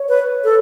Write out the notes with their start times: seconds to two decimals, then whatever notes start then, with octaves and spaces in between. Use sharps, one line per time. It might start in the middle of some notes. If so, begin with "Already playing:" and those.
Already playing: C#5
0.09 B4
0.44 A4